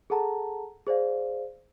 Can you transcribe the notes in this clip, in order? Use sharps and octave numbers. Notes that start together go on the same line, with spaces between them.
G#4 A4 F#5 A5 A#5
G#4 C5 D5 F5